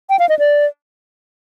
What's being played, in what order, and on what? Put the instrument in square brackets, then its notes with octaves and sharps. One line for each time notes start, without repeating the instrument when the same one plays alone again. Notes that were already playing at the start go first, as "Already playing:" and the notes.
[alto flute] G5
F5
D#5
D5